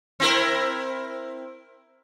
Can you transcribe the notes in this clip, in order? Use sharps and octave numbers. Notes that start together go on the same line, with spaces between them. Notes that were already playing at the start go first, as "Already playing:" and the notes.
C4 E4 A#4